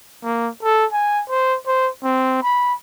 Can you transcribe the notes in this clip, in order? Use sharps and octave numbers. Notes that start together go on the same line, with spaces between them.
A#3
A4
G#5
C5
C5
C4
B5